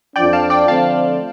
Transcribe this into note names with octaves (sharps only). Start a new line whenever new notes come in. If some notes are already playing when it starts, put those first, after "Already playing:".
F2 F3 D4 D5 G5
F5 A5
D5 G5
D3 F3 A3 C4 F5 A5